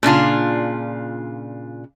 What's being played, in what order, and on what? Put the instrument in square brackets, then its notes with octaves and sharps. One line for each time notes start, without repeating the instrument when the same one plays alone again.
[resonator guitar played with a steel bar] A#2 C#3 D4 F4